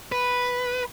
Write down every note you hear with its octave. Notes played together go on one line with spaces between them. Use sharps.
B4